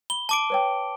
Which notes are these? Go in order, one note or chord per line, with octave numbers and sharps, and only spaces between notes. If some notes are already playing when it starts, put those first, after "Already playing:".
B5 G7
A5 D6 D7
B4 C#5 G5